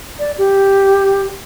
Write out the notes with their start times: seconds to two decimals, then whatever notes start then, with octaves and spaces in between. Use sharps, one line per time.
0.19 D5
0.38 G4